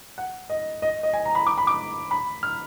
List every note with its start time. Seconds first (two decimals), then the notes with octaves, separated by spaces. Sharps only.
0.18 F#5
0.50 D#5
0.82 D#5
1.03 D#5
1.13 G#5
1.25 A#5
1.35 B5
1.47 D6
1.58 B5
1.67 D6
2.11 B5
2.43 F6